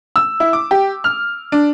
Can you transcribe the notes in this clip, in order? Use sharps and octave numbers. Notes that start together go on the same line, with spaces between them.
E6
E4
D6
G4
F6
D4